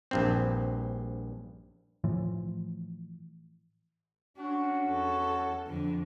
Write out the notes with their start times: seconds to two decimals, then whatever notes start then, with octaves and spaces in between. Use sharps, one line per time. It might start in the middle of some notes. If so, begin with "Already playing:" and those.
0.11 A#1 G2 C4
2.04 A2 E3 F3
4.37 C#4 D4 F#4
4.87 E2 A4
5.66 F2 D3